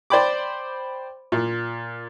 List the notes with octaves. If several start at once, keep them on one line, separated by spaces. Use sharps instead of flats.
C5 D5 G5 B5 D6
A#2